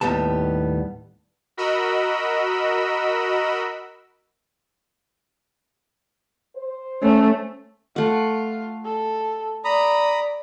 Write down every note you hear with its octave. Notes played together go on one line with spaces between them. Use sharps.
D#2 A2 G3 B3 A5
F#4 A#4 D#5 B5 E6
C5
A3 C#4
A3 F4 F#5
A4
D5 A#5 B5 D#6